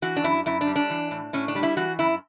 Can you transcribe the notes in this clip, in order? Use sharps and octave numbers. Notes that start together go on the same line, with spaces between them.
E3 F#4
D4
F#2 E4
F#2 E4
D4
G3
D4
E3
A2
A2 C#4
D4
G3
E4
E3 F#4
F#2 E4